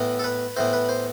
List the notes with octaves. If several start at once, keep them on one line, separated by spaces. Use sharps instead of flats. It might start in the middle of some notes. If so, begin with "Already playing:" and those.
Already playing: A2 E3 B3
A4
B4
A2 E3 B3 C5
B4
C5